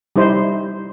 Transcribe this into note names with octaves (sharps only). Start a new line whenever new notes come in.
G3 D#4 E4 C5